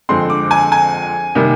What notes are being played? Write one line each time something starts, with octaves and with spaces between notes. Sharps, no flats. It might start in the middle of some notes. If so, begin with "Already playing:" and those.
F2 D3 G#3 C4 C6
D6
G#5
G#5
C3 D#3 G3 A#3